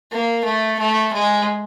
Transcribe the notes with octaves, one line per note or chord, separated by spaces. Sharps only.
A#3
A3
A3
G#3